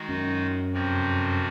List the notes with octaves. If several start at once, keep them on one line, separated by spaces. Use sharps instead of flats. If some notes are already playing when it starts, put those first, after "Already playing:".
Already playing: D#3 G#3 D#4 F#4
F#2
F2 C3 F3 C4 F#4